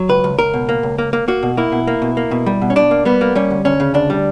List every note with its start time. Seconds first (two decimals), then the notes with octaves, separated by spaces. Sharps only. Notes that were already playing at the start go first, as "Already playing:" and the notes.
Already playing: F#3
0.09 C#2 B4
0.24 C#2
0.39 C#2 A#4
0.53 B2
0.69 A#3
0.83 C#2
0.98 A#3
1.13 A#3
1.28 A#3 F#4
1.43 B2
1.57 A#3 E4
1.72 B2
1.87 A#3
2.02 B2
2.17 A#3
2.31 B2
2.46 G3
2.62 B2
2.70 C#4
2.76 B2 D4
2.91 A#3
3.05 G3 B3
3.21 A#3
3.35 G3 C#4
3.50 D2
3.65 D2 C#4
3.80 C#3
3.94 D2 D4
4.10 G3